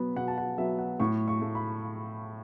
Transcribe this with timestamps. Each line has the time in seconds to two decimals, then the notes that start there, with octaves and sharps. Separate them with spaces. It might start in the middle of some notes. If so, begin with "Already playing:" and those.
Already playing: B2 F#3 B3
0.16 B2 F#5
0.28 A5
0.38 F#5
0.58 F#3 B3 E5
0.79 F#5
1.00 A2 C#6
1.28 C#6
1.41 A3
1.55 B5